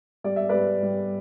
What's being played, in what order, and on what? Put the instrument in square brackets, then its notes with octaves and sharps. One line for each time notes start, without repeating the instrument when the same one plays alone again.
[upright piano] G3 D5
E5
G3 B4 D5
G3